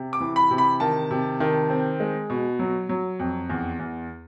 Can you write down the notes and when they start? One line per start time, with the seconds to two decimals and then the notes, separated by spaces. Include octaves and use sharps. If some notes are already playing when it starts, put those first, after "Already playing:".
Already playing: C3
0.13 D6
0.20 E3
0.36 B5
0.51 C3
0.58 B5
0.80 D#3 A5
1.11 C3
1.40 D#3
1.70 C4
2.00 G#3
2.30 B2
2.59 F#3
2.89 F#3
3.19 F2
3.49 E2
3.79 E2